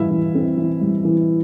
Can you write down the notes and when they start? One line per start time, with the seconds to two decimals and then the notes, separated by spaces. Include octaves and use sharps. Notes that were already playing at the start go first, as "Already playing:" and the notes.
Already playing: E3 G3 E4 E5 F5
0.11 E3
0.35 C4
0.57 E3
0.81 G3
1.05 E3